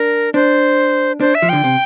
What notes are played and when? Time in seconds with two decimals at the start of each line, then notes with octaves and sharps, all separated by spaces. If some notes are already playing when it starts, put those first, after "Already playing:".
Already playing: D4 A#4
0.34 D4 C5
1.21 D4 C5
1.35 E5
1.42 F3
1.49 D3 G5
1.64 C3